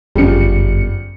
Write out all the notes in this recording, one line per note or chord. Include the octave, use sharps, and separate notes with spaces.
G1 F#2 C#3 F3 G3 C#7